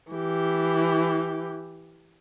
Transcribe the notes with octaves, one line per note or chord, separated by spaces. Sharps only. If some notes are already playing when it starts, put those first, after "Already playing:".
E3 G4